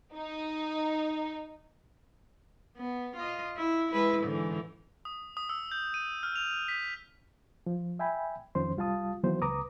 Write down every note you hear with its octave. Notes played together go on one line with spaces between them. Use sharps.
D#4
B3
F4 D#5
E4
G#3 E4 B4
G#2 D3 E3
D#6
D#6
E6
G6
D#7
F6
F7
B6
F3
E5 G5 G#5 B5
F2 D#3 F3 C#4 C5 C6
C2 G3 F4 F5 A5 D#6
D#3 E3 F#3 A#3 B3 C5
C#2 B4 A#5 D6 D#6